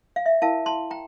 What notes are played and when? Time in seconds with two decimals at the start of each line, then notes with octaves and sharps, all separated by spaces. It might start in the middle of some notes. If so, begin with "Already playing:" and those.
0.16 F5
0.26 E5
0.42 E4 A#4 F5 A5
0.66 A5 C6
0.91 G5 A#5